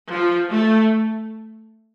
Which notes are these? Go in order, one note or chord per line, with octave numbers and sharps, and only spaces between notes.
F3
A3